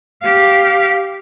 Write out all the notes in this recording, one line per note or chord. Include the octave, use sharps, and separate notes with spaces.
G4 F5